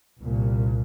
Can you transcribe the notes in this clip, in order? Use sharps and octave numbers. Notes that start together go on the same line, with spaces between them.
C2 A#2